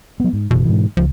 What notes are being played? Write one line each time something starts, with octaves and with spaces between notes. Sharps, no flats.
F#3 B3
G#2
F#1 B2 E3
G#2 E3
C#2 F3